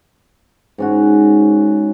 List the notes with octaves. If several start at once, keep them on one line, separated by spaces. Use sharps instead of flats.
G#2 C#4 F#4